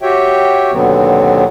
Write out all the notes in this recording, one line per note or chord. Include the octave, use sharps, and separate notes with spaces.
F#4 G4 C#5 E5 G5
D#2 B2 D3 F#3 B3 C4